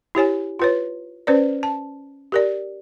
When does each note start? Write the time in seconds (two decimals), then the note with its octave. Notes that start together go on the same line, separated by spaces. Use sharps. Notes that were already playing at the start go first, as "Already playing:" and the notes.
0.15 E4 G4 C#5 G#5
0.59 F4 B4 C#5
1.27 C#4 B4 C5 D5
1.63 A5
2.32 G4 A#4 D5